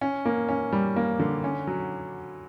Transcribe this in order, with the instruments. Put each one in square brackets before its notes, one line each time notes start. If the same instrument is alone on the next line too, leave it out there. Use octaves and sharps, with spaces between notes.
[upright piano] C#4
A#3
C#4
G3
A#3
D3
C#4
F#3